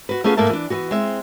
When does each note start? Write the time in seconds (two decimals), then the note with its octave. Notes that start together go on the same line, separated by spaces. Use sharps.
0.09 F#4 B4
0.24 A3 B3 C#4 F4 G#4
0.37 G#2 A3 A#3 E5 A5
0.50 E3 D4
0.70 E3 B3 F#4
0.91 G#3 C4 E5